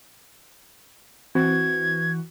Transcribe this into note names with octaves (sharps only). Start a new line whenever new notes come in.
E3 C4 F#4 G#6